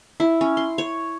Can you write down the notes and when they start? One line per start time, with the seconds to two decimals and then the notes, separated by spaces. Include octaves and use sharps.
0.20 E4
0.41 C#4
0.57 C6
0.78 C#5